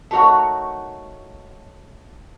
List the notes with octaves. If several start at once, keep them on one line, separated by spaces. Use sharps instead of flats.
A3 D#4 F#4 A#4 C#5 F#5